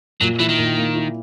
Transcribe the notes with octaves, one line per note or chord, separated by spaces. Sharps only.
A#2 F#3
E3 E4
D#3
A#2
A#3
E4